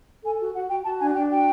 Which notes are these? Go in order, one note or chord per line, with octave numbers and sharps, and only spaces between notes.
A4 G#5
F#4
F#4 F#5
F#4 G5
F#4 A5
D4 G#5
D4 G5
F#4 G5